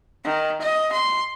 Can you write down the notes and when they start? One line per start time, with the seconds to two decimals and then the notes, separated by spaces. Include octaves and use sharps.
0.24 D#3
0.61 D#5
0.92 C6